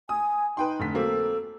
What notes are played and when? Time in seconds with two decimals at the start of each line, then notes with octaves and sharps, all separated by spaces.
0.09 G#5 D#6
0.57 D#4 B4 G5 C6
0.80 F1 D3 B6
0.94 F#3 A#3 C4 A4